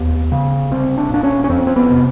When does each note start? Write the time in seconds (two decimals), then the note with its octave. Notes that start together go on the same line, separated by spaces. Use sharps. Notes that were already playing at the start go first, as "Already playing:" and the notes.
Already playing: D#2 B3
0.32 C#3
0.71 C2 C4
0.98 D4
1.10 A#2 D4
1.23 C#4
1.44 C#4
1.49 F2 C4
1.67 C4
1.76 B3
1.90 C3